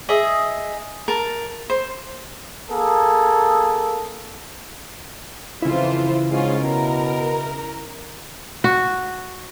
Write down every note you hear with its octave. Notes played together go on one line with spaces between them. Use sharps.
G#4 D#5 E5
A#4 A5
C5
A#3 G#4 A4
F2 C#3 E3 E4 F4 C5
G#2 C#4 F4 G#4
B2 A#4
F#4